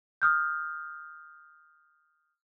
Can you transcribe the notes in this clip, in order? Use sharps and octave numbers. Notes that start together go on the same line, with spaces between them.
D#6 F6 G6